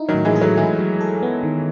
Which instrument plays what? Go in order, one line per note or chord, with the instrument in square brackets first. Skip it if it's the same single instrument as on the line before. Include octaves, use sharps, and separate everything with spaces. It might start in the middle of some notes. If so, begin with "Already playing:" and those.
Already playing: [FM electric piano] D#4 E4
[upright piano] D#3 F#3
[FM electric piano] A2
[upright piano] E3 G#3
[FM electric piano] G#4
[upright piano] F#3 A3
[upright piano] E3 G#3 [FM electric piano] E4
[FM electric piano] F#3
A4
B3
D#3